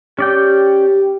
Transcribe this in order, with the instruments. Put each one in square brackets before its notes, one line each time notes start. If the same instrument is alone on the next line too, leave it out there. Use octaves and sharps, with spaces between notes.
[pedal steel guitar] C#4 D5 G5 [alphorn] G4